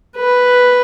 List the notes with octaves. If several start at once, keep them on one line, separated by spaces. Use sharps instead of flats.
B4